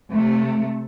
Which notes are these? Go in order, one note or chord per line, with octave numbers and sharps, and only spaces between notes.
C3 A3